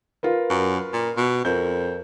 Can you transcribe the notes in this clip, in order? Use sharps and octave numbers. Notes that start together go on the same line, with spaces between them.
F4 A#4 B4
F#2
A#2
B2
F2 A#4 G6